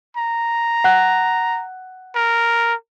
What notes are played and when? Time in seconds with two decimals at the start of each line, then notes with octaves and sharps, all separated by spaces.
0.17 A#5
0.84 F#5 F#6
2.15 A#4